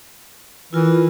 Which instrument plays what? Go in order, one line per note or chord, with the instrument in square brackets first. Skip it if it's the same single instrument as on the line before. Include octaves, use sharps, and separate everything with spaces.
[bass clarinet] E3 [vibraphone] E4 F4 A#4